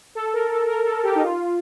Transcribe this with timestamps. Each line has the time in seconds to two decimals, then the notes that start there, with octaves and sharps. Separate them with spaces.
0.15 A4
0.33 A#4
0.51 A4
0.68 A#4
0.86 A4
1.03 G4
1.15 D#4
1.22 F4